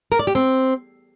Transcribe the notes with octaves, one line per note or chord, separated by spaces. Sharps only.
A#4
D5
G4
C4